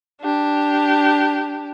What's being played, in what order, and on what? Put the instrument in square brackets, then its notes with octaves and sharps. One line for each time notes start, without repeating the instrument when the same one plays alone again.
[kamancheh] D4 G4